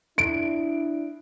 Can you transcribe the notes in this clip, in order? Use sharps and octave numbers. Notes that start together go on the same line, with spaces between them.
D4 E4 D7